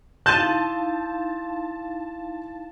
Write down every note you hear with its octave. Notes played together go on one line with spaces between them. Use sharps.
D#4 E4 F5 A5 C6 G6 D#7